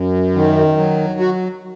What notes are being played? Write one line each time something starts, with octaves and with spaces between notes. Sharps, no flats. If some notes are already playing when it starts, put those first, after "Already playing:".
Already playing: F#2
D#3
F#3
F#4